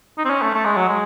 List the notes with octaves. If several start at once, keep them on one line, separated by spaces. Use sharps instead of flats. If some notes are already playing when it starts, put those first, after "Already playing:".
D#4
C4
C#4
A3
A3
G#3
F#3
G#3